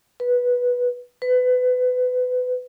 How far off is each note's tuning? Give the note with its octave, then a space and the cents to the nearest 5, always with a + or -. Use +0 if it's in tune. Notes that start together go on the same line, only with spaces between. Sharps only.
B4 -10
B4 +25